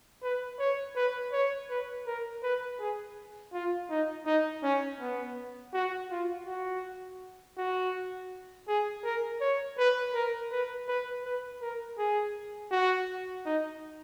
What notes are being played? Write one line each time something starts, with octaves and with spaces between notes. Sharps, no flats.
B4
C#5
B4
C#5
B4
A#4
B4
G#4
F4
D#4
D#4
C#4
B3
F#4
F4
F#4
F#4
G#4
A#4
C#5
B4
A#4
B4
B4
B4
A#4
G#4
F#4
D#4